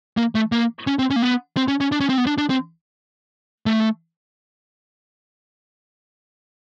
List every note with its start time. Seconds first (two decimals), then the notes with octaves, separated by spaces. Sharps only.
0.17 A#3
0.35 A3
0.52 A#3
0.87 C#4
0.99 C4
1.10 C#4
1.16 A#3
1.22 B3
1.57 C4
1.68 C#4
1.80 C#4
1.92 D4
2.00 C#4
2.09 C4
2.18 B3
2.27 D4
2.38 D4
2.50 C4
3.66 A3